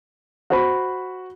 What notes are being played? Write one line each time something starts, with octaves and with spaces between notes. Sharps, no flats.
F#4 C5 B5